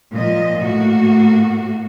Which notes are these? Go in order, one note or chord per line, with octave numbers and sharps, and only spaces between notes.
A#2 F3 D#5
A2 A3 A#3 F#4